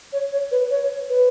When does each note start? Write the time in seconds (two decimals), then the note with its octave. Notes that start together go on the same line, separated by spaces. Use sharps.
0.13 C#5
0.32 C#5
0.51 B4
0.70 C#5
1.09 B4